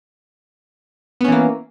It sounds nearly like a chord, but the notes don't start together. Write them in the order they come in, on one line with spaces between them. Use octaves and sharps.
B3 C#4 E3 A#3